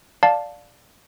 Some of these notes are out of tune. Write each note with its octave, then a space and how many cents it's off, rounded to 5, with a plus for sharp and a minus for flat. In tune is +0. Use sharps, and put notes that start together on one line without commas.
D5 +0 F5 +15 A5 +0